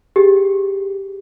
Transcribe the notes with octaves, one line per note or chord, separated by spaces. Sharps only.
G4 G#4